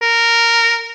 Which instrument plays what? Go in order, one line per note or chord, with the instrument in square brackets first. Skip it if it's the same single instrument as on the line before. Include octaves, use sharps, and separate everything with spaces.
[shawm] A#4